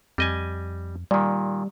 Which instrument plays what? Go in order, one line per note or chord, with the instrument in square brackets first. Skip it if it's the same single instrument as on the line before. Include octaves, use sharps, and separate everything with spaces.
[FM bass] F2 [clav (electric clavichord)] G3 D#5 G#5
[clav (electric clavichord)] A#2 D#3 [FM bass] G3